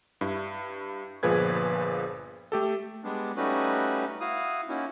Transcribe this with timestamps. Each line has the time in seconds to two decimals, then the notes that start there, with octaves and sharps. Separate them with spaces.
0.21 G2 E4
1.23 G1 A#2 F3 G#4 B4 G#6
2.52 A3 G4 A4
3.04 G3 G#3 B3 D4
3.37 G3 A3 C#4 D#4 F#4 B4
4.21 E4 F#4 F5 D#6
4.69 A#3 C#4 D#4 E4 F#4